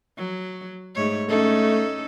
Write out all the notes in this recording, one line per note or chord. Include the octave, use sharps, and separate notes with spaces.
F#3
G#2 A3 C#5
A3 C#4 D#4 A4